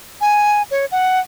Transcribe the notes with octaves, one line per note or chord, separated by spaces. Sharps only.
G#5
C#5
F#5